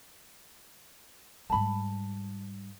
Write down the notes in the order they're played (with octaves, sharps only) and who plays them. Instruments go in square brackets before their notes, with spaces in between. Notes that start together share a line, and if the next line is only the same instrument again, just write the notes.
[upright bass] G#2 G3 [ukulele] A5 B5